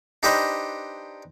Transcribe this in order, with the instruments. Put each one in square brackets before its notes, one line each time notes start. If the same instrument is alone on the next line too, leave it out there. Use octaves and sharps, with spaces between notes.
[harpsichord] D4 D#4 G4 B4 C5 D#5